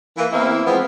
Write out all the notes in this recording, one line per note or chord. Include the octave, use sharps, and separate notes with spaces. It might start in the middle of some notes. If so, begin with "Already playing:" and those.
E3 A#3
E2 A#3 C4 E4
E3 F3 G#3 B3 C4